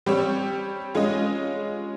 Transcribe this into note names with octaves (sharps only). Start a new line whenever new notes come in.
G3 C4 G4 C#5
G#3 C#4 F4 G#4 D#5